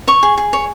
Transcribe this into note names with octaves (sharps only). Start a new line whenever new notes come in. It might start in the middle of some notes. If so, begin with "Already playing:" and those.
C#5 C#6
G#4
G#4
C#5